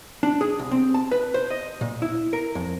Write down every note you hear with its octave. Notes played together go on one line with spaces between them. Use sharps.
D4
G#4
C2
C4
A5
B4
C5
D#5
A#2
E4
A#4
F2